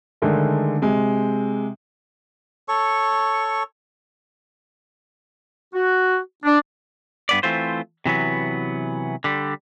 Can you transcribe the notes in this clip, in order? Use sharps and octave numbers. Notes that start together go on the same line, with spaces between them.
D3 D#3 G#3 A3
C3 G#3
A4 C#5 C#6
F#4
D4
G2 B3 D5
E3 A3 C4 F4 C5
C3 E3 F#3 B3
D3 G3